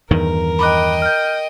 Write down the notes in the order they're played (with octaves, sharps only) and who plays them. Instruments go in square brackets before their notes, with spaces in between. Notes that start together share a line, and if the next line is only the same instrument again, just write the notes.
[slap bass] E2 G2 D#3 [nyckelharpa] A#4
[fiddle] D#5 G5 [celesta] B5 D6 F#6
[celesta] F6 G6